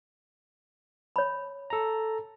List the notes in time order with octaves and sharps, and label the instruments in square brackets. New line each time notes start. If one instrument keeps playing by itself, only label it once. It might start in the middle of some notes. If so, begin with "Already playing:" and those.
[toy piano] C#5 B5
[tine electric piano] A4 A#5